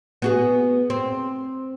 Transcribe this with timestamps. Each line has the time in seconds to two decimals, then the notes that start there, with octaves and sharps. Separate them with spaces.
0.22 B3 F#4 G#4
0.90 C4